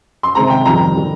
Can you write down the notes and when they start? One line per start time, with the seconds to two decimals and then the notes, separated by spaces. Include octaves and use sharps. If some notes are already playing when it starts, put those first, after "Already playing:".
0.23 C6
0.35 C3 D#3 G#3 C4 A#5
0.50 G5
0.65 F2 D#3 G3 A#5
0.96 D3 G3